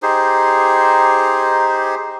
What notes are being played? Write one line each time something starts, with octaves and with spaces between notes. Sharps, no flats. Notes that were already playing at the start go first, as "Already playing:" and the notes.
D#4 G4 G#4 C5